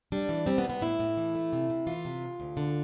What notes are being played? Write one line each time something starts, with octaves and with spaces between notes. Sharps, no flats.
G3 D4
E3
G3 C4
B3
C3
B3
A2 E4
A2
E3
A3
C3
C3
E3 F4
C3
D2
D2
D3